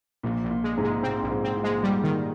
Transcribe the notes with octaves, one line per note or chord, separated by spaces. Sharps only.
A#1 A#2
A#1
A#2
G#3
G#2 C3
G#3
A#2 C4
A#1
G#2
C4
A#2
G#3
G3
D#3